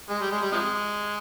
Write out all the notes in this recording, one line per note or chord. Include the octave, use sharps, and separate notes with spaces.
G#3
G3
G#3
G3
C3 F3 G#3